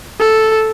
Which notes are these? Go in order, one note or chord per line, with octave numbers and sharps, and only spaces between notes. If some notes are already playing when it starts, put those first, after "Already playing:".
A4